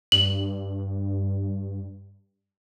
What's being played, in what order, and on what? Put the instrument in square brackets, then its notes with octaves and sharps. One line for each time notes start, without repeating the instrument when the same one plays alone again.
[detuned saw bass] G2 [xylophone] F#7